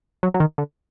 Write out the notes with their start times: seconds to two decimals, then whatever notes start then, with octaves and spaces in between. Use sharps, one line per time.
0.23 F#3
0.34 F#3
0.40 D#3
0.58 D3